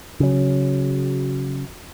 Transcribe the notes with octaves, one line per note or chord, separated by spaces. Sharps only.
C#3 F#3